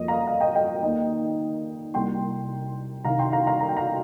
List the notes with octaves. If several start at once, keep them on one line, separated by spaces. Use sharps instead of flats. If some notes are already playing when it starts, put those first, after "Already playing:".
Already playing: F2 F3 A#3 D#5
F5 A#5
F5 A#5
D#5 G5
D#5 G5
D#2 D#3 A#3 D#5 G5
C2 C3 G3 A#3 G5 C6
C2 C3 D#3 F5 A#5
G5 C6
F5 A#5
F5 A#5
A#5
G5
F5 A#5